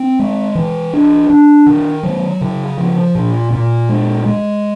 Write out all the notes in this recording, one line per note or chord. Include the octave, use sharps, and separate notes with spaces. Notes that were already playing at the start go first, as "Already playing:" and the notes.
Already playing: C4
G#3
E3
D4
D4
D#3
F#3
C#3
F3
A#2
A#2
G#3
G#3